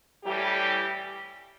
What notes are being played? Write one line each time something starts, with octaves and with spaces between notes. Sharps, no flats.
A2 E3 G3 G4